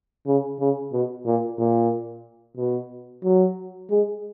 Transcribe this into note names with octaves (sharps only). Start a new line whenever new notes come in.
C#3
C#3
B2
A#2
A#2
B2
F#3
G#3